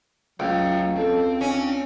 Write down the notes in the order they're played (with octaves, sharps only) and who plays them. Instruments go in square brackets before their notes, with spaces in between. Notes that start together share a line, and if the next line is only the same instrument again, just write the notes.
[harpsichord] C#2 [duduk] F#3 [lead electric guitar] A3 G5
[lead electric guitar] C4 [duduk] A4
[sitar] C#4 [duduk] D4